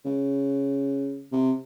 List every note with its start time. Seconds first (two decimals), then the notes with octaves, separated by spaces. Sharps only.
0.05 C#3
1.32 C3